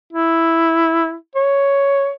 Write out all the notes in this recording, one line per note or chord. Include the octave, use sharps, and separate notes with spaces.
E4
C#5